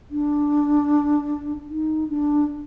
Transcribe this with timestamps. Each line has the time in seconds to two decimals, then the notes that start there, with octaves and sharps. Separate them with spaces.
0.11 D4
1.69 D#4
2.09 D4